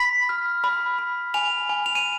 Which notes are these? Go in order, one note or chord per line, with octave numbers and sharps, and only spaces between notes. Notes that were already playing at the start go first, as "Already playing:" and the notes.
Already playing: B5 B6
F6
B5
B5
G#5 F7
G#5
F7
D#7